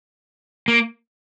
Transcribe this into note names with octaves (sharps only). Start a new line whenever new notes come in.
A#3